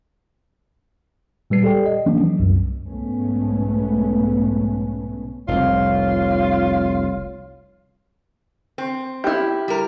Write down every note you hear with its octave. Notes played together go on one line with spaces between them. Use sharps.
A#2 G3 B4 C7
G4 A4 D5 G5
D#5
E3 F3 A#3 C#4 D4
F#3
C2 F#2
B1 G#2 A3 B3 C#4
F1 C2 F4 C#5
C4
E4 G4
G3 A#4